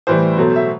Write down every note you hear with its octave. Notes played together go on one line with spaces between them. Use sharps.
A2 E3 G3 C5
B2 F#3 A3
E5